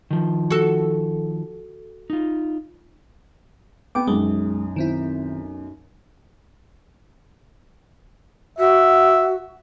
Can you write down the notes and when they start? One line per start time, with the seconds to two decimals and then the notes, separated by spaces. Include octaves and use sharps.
0.11 D#3 F3
0.51 F#4 A4
2.10 D#4 F4
3.95 B3 G5 D6
4.07 B1 F#2 G#3
4.76 D#3 C4 E4
8.59 F#4 E5